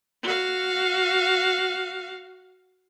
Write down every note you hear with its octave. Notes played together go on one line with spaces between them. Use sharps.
F#4 F5